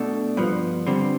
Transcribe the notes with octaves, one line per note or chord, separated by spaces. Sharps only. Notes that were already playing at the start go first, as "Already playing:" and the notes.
Already playing: B2 A3 D4
G2 F3 B3
D3 G3 C4